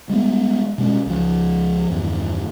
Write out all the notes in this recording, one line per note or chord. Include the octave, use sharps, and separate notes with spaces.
G3 G#3 A#3 B3
B2 G#3 C#4
C#2 F3
E2 G2 D#3